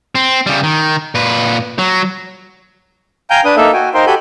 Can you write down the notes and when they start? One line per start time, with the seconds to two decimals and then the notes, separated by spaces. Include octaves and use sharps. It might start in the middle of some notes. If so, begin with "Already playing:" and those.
0.15 C4
0.47 C#3 G3
0.63 D#3
1.15 A#2 B4
1.78 F#3
3.30 F5 G5 G#5 A#5 G6
3.45 D4 B4 D#6
3.57 A#3 D#4 A4 E5 F5
3.73 F#4 G5 G#5
3.94 D#4 A#4 C5 F5 G5 C6
4.07 F#4 G4 A4 G#5 B5 G6